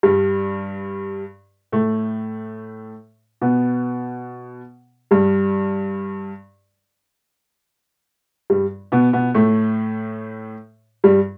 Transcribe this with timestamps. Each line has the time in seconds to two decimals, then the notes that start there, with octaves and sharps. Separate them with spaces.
0.03 G2 G3
1.72 A2 A3
3.42 B2 B3
5.11 G2 G3
8.50 G2 G3
8.92 B2 B3
9.13 B2 B3
9.34 A2 A3
11.04 G2 G3